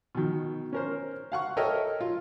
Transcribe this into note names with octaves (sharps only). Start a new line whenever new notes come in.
B2 D#3
C#4 A#4 C5
F5 F#5 C#6
A4 A#4 C#5 D#5 E5 G5
F4